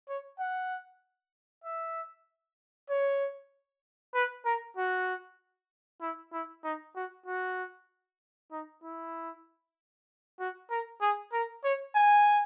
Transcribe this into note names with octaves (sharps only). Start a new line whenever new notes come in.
C#5
F#5
E5
C#5
B4
A#4
F#4
E4
E4
D#4
F#4
F#4
D#4
E4
F#4
A#4
G#4
A#4
C#5
G#5